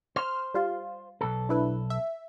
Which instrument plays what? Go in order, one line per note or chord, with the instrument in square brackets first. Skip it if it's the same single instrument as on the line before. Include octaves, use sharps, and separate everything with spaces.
[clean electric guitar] C5 [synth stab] F6
[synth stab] G3 F4 F5
[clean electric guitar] B1 A4
[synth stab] D4 E4 B4
E5